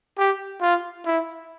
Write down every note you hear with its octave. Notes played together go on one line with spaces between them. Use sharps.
G4
F4
E4